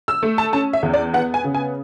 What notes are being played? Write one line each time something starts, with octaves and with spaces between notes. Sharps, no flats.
E6
A3
A5
C#4 A5
E5
E2
D5
B3 F#5
G#5
C#3
G#5